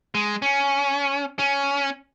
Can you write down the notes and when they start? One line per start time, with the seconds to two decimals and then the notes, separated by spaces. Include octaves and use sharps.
0.15 G#3
0.42 C#4
1.39 C#4